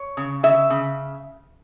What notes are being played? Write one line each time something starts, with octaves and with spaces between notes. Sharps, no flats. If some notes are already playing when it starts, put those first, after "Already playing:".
Already playing: C#5
C#3
C#3 E5
C#3